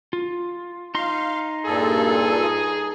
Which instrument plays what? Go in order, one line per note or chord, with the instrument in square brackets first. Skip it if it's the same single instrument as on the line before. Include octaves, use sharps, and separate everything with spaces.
[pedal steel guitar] F4
[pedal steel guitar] D#4 C6 [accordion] F5
[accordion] G2 A#2 A4 [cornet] G#4